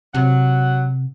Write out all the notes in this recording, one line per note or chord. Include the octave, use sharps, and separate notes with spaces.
C3 F#3 F#5